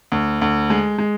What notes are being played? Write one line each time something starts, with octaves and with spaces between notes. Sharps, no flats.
D2
D2
G#3
G#3